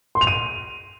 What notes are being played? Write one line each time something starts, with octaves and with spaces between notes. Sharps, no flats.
C6
F7
D#7